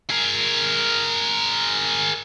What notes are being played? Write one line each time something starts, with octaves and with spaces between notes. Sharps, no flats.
G#4 A#4